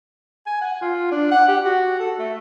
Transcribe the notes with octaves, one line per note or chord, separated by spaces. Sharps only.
G#5
F#5
F4
D4
F#5
G4
F#4
A4
A3